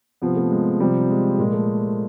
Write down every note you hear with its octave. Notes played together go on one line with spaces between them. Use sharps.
C3 F3 B3
A3
G#3
C3 F3 G3
G#3
A#2 F3 G#3
A3